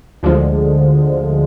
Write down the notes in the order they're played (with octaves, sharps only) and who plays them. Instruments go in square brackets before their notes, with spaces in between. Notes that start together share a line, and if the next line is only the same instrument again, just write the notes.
[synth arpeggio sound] D2 D3 F3 G#3